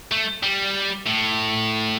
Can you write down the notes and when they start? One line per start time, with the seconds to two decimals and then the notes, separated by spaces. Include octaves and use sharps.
0.11 A3
0.43 G3
1.07 A2